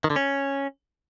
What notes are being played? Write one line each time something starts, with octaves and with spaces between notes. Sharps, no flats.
D#3
D3
C#4